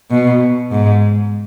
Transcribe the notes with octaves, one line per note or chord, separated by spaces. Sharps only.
B2
G#2